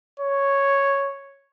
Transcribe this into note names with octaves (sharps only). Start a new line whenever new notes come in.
C#5